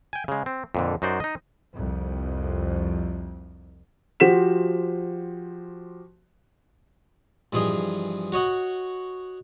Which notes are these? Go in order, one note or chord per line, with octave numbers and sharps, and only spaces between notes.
G5 G#5
C#3 G#3
C4
F2 A#2 D3
F#2 D#4 F#4 C5 D5
D#4 D#5
C2 F2
F3 F#4 G4 C5 B6 E7
G2 E3 F3 G#4 D#5
F#4 C#5 D#5 F#5